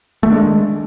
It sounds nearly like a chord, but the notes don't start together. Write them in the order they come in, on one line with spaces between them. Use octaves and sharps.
A3 D#3 D4 G#3